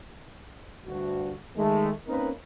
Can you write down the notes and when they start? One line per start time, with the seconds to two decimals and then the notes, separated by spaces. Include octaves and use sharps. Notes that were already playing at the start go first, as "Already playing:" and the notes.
0.87 D2 G2 F#4
1.56 D#3 G#3 A3
2.07 A#3 C4 C#4 D#4 A#4 B4